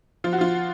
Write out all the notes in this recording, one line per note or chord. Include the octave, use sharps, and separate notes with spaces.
F3 F4
F#4
F3 F4